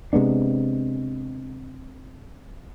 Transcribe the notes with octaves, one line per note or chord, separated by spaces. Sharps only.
C3 G#3 B3 D4